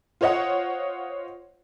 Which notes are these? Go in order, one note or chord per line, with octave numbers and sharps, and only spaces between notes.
F4 C5 C#5 D#5 F#5